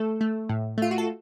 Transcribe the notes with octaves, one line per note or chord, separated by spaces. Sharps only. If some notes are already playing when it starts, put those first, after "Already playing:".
Already playing: A3 A4
A3
A2
A3 F4
F#4
A4